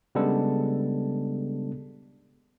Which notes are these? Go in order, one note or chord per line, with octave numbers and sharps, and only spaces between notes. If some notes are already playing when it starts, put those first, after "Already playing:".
C#3 G3 G#3 B3 D4 A4